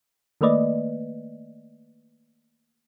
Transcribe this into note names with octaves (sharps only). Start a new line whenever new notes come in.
D#3 A3 A#3 B4 D5 D#5